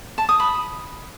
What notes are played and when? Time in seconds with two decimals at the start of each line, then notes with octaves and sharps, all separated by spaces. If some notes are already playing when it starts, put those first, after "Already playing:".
0.18 A5
0.29 D#6
0.40 B5